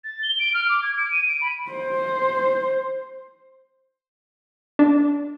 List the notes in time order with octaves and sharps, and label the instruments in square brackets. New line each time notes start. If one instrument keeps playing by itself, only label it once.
[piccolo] A6
G7
D7
F6
D6
G#6
D7
D#7
D7
B5
[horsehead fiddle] C5
[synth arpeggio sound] D4